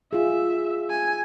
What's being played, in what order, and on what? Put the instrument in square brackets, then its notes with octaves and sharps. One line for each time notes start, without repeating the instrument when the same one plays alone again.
[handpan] F4 G#4 [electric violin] E5
[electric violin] G#5